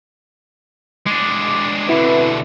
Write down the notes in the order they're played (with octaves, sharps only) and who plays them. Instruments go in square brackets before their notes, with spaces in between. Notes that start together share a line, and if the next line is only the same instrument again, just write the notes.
[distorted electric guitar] G#3 D4 [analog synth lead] D6
[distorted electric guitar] B2 D3 [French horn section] C4 B4 [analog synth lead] E4